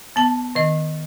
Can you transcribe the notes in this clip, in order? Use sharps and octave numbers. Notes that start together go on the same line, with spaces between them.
B3 A5
D#3 D#5